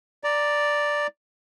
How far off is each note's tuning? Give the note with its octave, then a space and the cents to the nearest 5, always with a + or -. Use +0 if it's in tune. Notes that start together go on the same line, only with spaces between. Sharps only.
D5 +0 A#5 +0